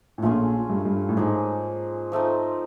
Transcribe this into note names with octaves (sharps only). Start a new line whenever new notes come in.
A2
A#1 A#2 A3 C#4 F4 G#4
G2
G2
A2
G#2 F3 A#3 D#4 G#4
F3 A3 C4 D#4